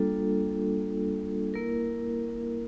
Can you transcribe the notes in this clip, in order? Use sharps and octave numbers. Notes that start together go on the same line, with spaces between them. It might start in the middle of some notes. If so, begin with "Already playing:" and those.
Already playing: G3 A#3 D4 F4 A4
A#3 E4 A#4